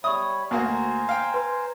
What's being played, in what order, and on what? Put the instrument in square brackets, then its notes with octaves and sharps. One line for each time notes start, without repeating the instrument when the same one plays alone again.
[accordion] G3 C#5 B5 [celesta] E5 C#6 [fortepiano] D#6
[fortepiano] D2 A#3 F#4 [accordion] C5 G#5 A#5
[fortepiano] F5 G5
[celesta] B4 C6